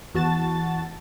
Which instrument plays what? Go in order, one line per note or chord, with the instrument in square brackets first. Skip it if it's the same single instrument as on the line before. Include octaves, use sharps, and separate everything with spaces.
[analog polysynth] E2 F#4 A5 A6